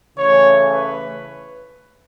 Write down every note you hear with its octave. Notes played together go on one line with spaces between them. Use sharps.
C#3 E3 A3 C#5
B4